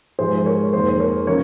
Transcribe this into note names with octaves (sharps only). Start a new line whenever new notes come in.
G#2 F3 G#3 G#4 C5
A#4 C#5
F2 D#3 A#3 G#4 C5
A#4 C#5
C#3 F3 A#4 C#5